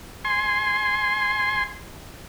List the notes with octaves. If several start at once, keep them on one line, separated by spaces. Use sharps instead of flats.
G#5 C6